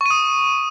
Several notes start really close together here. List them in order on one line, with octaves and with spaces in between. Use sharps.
C#6 D#7 D#6